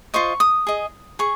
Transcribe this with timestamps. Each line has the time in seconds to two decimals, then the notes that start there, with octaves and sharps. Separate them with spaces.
0.14 F4 C5 D#5 C#6
0.40 D#6
0.67 G#4 D#5
1.19 G#4 C#6